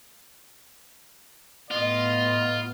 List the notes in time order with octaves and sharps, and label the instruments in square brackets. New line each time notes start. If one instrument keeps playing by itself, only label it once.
[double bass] A2 B3 [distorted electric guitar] F4 [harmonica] D#5